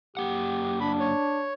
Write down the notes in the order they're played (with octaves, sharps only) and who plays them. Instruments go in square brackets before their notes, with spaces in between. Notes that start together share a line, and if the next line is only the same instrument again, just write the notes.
[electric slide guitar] F#2 A#3 F#5 [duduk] G4
[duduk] D4 [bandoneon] B5
[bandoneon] C#5